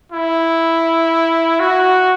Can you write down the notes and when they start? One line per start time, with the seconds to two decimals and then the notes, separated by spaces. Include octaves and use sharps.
0.12 E4
1.60 F#4